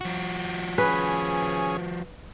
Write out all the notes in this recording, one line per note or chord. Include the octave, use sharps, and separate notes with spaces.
F3 F#4
C#4 G#4 B4